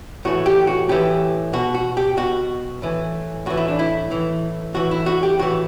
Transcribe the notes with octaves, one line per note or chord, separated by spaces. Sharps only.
A2 E3 F#4
G4
F#4
A2 E3 G4
B2 F#4
F#4
G4
B2 F#4
A2 E3
A2 E3 F#4
E4
D4
E4
A2 E3
A2 E3 F#4
E4
F#4
G4
A2 E3 F#4